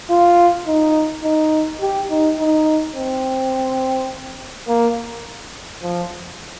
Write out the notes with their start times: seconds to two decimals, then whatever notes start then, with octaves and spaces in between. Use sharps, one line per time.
0.10 F4
0.67 D#4
1.24 D#4
1.81 G4
2.10 D#4
2.39 D#4
2.96 C4
4.68 A#3
5.82 F3